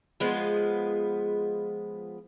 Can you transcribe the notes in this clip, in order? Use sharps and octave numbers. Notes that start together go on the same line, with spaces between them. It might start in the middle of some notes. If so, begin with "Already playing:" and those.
F3 G#3 B3